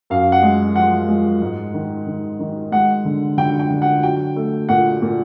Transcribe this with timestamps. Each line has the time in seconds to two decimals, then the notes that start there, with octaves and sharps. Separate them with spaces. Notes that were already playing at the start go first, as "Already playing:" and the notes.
0.10 F#2 F5
0.32 F#5
0.43 G#3
0.76 F3 F#5
1.09 G#3
1.42 G#2
1.74 D#3
2.07 D#3
2.40 D#3
2.72 G#3 F#5
3.05 D3
3.38 D3 G5
3.59 G5
3.70 D3
3.82 F#5
4.03 F#3 G5
4.36 A3
4.69 A#2 F#5
5.02 A#2